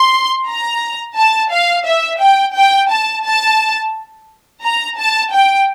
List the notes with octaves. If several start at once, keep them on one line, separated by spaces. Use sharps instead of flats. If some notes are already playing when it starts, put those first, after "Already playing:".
Already playing: C6
A#5
A5
F5
E5
G5
G5
A5
A5
A#5
A5
G5